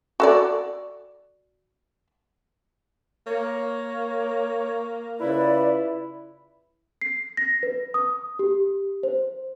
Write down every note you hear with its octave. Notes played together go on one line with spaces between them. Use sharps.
F#4 A4 D5
A#3 C#5
C#3 E4 F4 B4 D5
C7
A#6
B4
D#6
G4
C5